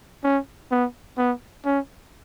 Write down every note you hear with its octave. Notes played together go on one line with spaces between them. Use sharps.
C#4
B3
B3
C#4